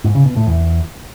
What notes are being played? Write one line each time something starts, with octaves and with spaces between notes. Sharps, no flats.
G#2
C#3
B2
A2
E2